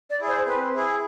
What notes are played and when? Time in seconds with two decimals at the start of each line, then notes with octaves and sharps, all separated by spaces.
0.10 D5
0.20 E4 G#4
0.28 C5
0.46 C4 B4
0.74 E4 G#4